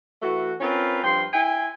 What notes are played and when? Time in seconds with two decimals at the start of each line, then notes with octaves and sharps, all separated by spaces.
0.22 E3 A3 F#4
0.61 C4 C#4 F4 A#4 B4
1.03 G2 F3 G5 C6
1.33 E4 G5 G#5